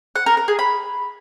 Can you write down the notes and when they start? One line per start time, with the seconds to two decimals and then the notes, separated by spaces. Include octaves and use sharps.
0.16 F#5
0.26 A#4
0.37 A#4
0.48 G#4
0.59 B5